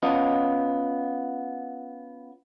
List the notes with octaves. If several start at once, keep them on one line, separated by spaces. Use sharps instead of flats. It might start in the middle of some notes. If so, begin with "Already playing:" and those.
B3 C#4 F4 D#5